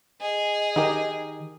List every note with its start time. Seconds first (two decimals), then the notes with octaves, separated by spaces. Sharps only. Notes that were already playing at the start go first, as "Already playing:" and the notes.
0.21 G#4 D#5
0.76 D#3 D#4 G4 A#4